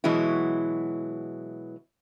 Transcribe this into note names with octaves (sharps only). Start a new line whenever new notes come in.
B2 E3 F#3 G#3 E4